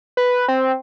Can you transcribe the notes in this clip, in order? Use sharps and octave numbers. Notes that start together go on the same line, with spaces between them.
B4
C4